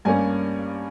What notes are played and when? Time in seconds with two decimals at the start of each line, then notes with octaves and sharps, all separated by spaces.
0.05 G2 G3 A#3 C#4 G#5